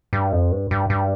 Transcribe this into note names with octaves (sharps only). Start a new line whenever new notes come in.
G2
F2
G2
G2
G2